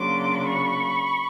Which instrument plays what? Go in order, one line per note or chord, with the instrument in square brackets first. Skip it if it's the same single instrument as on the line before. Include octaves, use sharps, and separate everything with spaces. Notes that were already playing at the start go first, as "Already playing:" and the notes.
Already playing: [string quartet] C#3 F#3 A#3 D4 C6 D6
B5 C#6